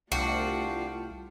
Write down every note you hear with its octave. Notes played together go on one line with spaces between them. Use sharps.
C2 A3 D4 F4 F#4 F5 G5